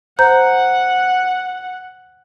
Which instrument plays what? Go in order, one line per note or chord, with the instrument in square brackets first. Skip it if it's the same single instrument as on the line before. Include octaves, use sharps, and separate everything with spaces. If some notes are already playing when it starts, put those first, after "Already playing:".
[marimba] C5 A#5 G6 [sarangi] F#5